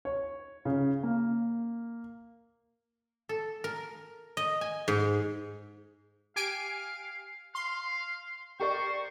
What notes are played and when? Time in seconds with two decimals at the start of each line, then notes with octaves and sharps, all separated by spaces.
0.05 C#5
0.65 C#3
1.03 A#3
3.29 A4
3.64 A#4
4.37 D#5
4.61 G#5
4.88 G#2
6.36 G4 F5 G#5 D7
7.55 F5 C6
8.60 G4 A#4 C5 D5 C#6